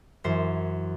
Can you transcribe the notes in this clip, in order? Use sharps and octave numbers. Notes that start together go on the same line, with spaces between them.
F#2 E3 C5